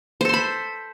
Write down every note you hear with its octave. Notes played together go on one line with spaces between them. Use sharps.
A4 C5 B5 C6